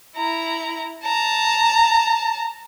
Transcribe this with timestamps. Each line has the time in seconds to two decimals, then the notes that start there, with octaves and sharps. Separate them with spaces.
0.17 E4 A#5
1.03 A5 A#5